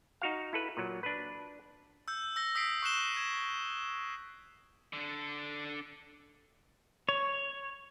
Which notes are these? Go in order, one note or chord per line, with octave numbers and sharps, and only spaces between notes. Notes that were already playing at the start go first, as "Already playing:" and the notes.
D#4 F#4 F5
E4 A4 B4
A#2 F#3
D4 B4
E6 G6
E6 A#6 G7
D#6 E6 B6 C7 D7
C#6 E6 F#6 C7 E7 G7
G#6 E7
D3 D4
C#5